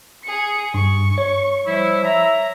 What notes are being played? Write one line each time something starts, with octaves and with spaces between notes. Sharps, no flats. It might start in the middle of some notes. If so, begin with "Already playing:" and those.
G#4 C#7
G2 C#6
C#5
F3 G3 E4
E5 A#5